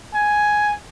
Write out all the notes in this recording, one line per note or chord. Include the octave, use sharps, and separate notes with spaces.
G#5